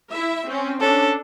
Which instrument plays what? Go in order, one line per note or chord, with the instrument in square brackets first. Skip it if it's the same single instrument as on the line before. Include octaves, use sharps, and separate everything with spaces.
[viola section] E4 E5
C4 C#4
[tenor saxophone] C#4 [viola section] D4 [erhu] A4